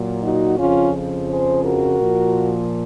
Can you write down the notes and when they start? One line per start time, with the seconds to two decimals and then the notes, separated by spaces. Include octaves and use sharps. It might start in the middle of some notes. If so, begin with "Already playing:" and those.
Already playing: A#2 F#3
0.23 D#4 F#4
0.58 F2 C#3 F3 C#4 F4
1.29 G#4 C5
1.64 F#4 A#4
1.99 A#2 F3